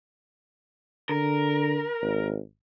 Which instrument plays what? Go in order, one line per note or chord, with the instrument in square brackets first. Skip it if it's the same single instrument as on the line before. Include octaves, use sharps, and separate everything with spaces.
[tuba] D3 [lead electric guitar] A#4
[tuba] G#1